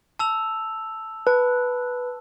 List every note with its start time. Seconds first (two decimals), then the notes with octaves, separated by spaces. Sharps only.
0.19 A5 E6 F7
1.27 B4 A5